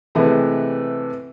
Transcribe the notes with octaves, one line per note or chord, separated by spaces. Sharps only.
C3 E3 G#3 A3 B3